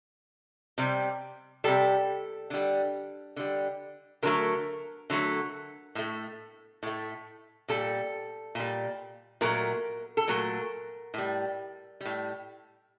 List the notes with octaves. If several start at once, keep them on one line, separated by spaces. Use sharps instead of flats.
C3 G3
C3 G3 A4
D3 G3
D3 G3
D3 F#3 A3 A#4
D3 F#3 A3
A2 A3
A2 A3
A#2 G3 A4
A#2 G3
A#2 F#3 A3 A#4
A4
A#2 F#3 A3 A#4
A2 G3
A2 G3